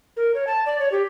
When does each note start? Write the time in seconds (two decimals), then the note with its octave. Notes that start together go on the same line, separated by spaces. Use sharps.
0.17 A#4
0.35 C#5
0.47 A5
0.66 D5
0.79 C#5
0.92 G4